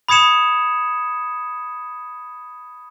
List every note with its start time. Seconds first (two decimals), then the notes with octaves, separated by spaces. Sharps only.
0.09 B5 D#6 G#6 C#7 E7